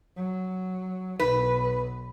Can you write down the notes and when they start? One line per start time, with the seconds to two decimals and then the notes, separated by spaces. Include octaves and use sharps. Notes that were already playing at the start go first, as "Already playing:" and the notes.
0.16 F#3
1.19 B1 B4